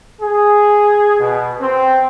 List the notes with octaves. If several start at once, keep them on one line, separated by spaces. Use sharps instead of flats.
G#4
B2
C4